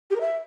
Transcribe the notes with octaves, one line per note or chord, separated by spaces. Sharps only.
G4
A#4
E5